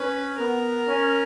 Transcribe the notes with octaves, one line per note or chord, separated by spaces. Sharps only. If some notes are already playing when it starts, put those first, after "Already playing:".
Already playing: C#4 B4
B3 A#4
C#4